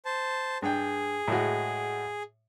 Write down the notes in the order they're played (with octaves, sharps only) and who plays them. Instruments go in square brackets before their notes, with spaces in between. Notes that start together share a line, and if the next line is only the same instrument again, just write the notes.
[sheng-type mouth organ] C5 A5
[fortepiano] G2 G5 [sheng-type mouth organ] G#4
[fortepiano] A2 G#3 F#4